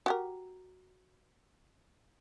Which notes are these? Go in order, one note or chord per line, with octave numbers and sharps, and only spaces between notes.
F#4 G4 A#4